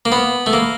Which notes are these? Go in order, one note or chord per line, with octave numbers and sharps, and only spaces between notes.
A#3
B3
A3
A#3